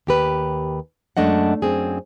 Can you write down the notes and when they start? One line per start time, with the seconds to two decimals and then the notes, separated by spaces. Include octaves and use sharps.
0.07 D#2 G4 B4
1.17 F#2 G#3 A3 D4 D#5 F#5
1.62 F#2 C4 G#4